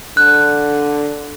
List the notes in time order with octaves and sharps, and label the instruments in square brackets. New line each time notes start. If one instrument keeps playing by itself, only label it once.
[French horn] D3 [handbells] F#6